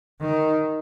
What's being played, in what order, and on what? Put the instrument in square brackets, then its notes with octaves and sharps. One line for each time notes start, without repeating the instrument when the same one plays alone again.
[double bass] D#3